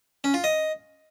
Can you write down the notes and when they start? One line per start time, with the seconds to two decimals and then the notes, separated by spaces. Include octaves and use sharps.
0.24 C#4
0.34 F4
0.44 D#5